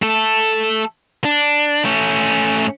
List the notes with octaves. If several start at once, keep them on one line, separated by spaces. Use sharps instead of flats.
A3 A4
D4
A3 C#4